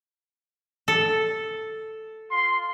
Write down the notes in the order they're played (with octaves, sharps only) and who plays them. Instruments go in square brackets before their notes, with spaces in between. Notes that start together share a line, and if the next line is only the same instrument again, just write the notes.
[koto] A4
[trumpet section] F4 F5 C6